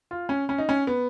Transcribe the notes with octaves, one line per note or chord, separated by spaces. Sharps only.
F4
C#4
C#4
D#4
C#4
B3